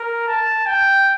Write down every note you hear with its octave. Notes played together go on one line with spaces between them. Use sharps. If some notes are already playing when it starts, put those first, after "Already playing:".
Already playing: A#4
A5
G5